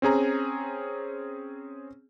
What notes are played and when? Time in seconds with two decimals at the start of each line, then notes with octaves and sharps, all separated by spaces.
0.02 C4 C#4 G#4 A#5